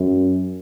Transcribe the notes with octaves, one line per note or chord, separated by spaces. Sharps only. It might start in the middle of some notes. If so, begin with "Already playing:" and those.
Already playing: F#2